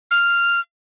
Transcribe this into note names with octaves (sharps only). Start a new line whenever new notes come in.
F6